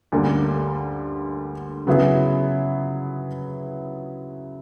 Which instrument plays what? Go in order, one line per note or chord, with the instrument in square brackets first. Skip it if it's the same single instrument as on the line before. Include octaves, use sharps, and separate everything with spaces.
[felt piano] D2 D3 G3 A#3 C#4
[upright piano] C#3 [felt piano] F#3 B3 E4 G#4